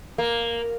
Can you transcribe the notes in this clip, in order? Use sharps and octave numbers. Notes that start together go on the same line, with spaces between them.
A#3